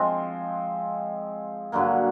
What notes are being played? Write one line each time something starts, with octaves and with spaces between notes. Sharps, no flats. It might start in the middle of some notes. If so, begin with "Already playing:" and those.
Already playing: F3 G#3 C4
G2 D3 F#3 A#3